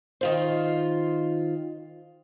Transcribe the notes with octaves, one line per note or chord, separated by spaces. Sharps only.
D#3 F4 C5